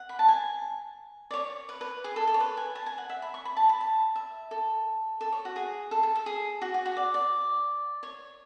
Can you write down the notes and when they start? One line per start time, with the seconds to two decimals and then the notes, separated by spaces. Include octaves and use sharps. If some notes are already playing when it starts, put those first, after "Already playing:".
Already playing: F#5
0.09 B5
0.19 A5
0.28 G#5
1.31 D5
1.34 C#5
1.69 B4
1.81 B4
2.04 G#4
2.16 A4
2.27 A4
2.34 C#5
2.40 B4
2.57 G#5
2.75 A5
2.86 G#5
2.98 F#5
3.09 E5
3.22 B5
3.34 C#6
3.45 B5
3.57 A5
3.69 B5
3.81 A5
4.16 E5
4.51 A4
5.21 A4
5.32 C#5
5.45 F#4
5.56 G#4
5.91 A4
6.03 A4
6.15 A4
6.26 G#4
6.62 F#4
6.74 F#4
6.86 F#4
6.97 D5
7.14 D5
8.03 C#5